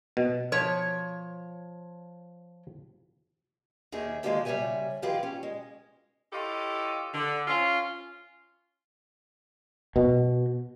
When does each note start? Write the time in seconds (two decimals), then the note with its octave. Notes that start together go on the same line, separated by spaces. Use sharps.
0.17 B2
0.52 F3 C#5
3.92 D#2 D#3 G#4 E5
4.23 D#3 G#3 A#3 F4 G4 A4
4.45 C#3 G3 B3 C#5 E5 G#5
5.02 D#3 F3 F4 G4 G#4 B4
5.23 C#4
5.43 G#3
6.32 E4 F4 G4 A4 C#5 D#5
7.13 D3
7.47 C#4 F4
9.96 B2